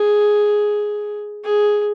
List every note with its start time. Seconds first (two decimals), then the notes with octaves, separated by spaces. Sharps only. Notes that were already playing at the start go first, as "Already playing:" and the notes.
Already playing: G#4
1.44 G#4